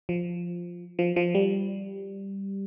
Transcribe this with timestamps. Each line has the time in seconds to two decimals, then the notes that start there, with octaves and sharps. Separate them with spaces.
0.09 F3
0.99 F3
1.16 F3
1.35 G3